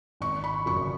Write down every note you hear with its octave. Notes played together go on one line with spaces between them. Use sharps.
G#1 C#6
B5
F#2 C#3 C#6